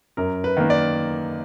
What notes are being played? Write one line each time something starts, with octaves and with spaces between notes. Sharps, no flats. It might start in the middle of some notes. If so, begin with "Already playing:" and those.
F#2 A#4
B4
D#3 A#3
D5